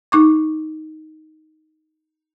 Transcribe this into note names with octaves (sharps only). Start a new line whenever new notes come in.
D#4 C#6 D6